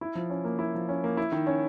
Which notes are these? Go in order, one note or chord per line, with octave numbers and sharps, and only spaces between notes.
E4
F3
C#4
A#3
E4
F3
C#4
A#3
E4
D#3
C#4